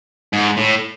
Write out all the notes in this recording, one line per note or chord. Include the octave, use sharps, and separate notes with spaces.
G#2
A2